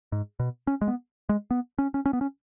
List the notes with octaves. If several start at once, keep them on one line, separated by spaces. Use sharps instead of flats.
G#2
B2
C#4
G#3
B3
G#3
B3
C#4
C#4
C#4
B3
C#4